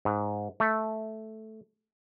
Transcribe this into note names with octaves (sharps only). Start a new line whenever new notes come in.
G#2
A3